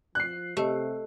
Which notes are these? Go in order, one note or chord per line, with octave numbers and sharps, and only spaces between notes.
F3 F#6 C7
C3 A3 G4 D#5